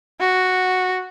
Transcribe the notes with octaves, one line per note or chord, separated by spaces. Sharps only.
F#4